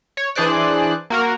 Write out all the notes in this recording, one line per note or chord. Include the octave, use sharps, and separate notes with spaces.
C#5
E3 D4 G#4 C5 D5 F#6
A#3 F#4 A#4